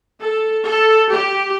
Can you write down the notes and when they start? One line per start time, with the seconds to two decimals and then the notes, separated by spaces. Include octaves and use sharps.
0.19 A4
0.65 A4
1.11 G4